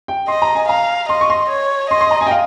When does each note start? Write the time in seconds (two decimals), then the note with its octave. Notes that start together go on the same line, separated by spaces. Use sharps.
0.08 G5
0.28 D#5 C6
0.42 A#5
0.55 G#5
0.69 F5 A#5
1.09 D#5 C6
1.21 C#6
1.30 C6
1.50 C#5
1.90 D#5 C6
2.01 C6
2.11 A#5
2.21 G#5
2.27 G5
2.31 F5